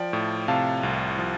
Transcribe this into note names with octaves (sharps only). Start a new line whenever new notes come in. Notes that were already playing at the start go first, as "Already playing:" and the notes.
Already playing: F3 D5 G5
A2
C3 F5 A5
C2
F3